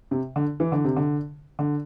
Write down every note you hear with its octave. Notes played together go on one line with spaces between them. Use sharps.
C3
D3
E3
D3
C3
D3
D3